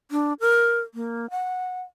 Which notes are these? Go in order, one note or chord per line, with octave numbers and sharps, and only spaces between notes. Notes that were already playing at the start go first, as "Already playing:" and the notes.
D4
A#4
A#3
F#5